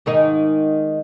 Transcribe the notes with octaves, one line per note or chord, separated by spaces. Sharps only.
G#2 D#3 D#4